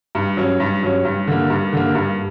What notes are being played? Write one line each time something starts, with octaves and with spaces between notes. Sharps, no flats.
G2
F#3 C#4
G2
F#3 C#4
G2
D3 A#3
G2
D3 A#3
G2